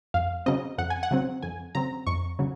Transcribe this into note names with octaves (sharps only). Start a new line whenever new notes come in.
F2 F5
C#3 F#3 C4 D#5
F2 F#5
G#5
F#5
C#3 F#3 C4
F2 G#5
C#3 F#3 C4 A#5
F2 C#6
C#3 F#3